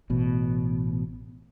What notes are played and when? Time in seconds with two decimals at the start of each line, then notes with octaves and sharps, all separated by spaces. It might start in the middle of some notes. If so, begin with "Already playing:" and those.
0.10 A1 B2